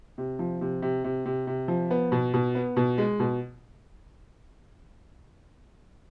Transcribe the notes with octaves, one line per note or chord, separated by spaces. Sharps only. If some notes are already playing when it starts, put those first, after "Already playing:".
C3
F3
C3
C3
C3
C3
C3
F3
B3
B2
B2
B3
B2
G#3
B2